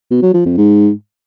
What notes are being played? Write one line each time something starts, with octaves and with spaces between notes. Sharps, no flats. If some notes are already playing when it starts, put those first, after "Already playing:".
B2
F#3
F3
F2
G#2